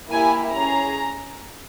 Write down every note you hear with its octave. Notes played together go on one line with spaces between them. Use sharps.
A#3 E4 G4 G#5
C#4 G#4 A#5